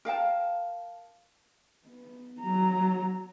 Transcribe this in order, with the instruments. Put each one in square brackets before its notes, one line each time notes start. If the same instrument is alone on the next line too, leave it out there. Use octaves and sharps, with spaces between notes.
[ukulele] A#4 F5 G5 A5
[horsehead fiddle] B3
F#3 A#5